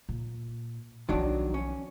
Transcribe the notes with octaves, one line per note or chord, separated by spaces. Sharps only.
A#2
B1 D#3 F3 F#3 D4
C#4